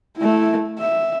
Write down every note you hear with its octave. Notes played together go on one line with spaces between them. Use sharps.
A3 E4
E5